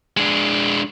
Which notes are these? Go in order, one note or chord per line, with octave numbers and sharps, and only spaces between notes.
G#3 D4